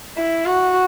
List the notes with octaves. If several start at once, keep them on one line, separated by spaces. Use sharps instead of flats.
E4
F#4